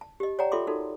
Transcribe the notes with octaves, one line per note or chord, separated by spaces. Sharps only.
A5
G4 D#5
C#5 D5 F#5 G5 A5 A#5
F4 A4 E5 C6 D6
D#4 F#4 A4 A#4